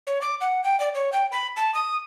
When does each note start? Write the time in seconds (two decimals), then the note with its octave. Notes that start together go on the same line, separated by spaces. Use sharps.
0.07 C#5
0.22 D6
0.41 F#5
0.64 G5
0.80 D5
0.95 C#5
1.13 G5
1.32 B5
1.57 A5
1.75 D#6